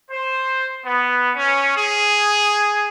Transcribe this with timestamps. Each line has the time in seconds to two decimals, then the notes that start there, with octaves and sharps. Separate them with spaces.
0.11 C5
0.84 B3
1.35 C#4
1.76 G#4